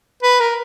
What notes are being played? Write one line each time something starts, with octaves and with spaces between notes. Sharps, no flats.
B4
A#4